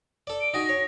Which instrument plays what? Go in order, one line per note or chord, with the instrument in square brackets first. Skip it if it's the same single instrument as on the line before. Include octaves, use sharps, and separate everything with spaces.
[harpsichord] A4 D5
[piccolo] D7
[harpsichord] D#4 F#4 G#4 [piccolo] A#6
[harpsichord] C#5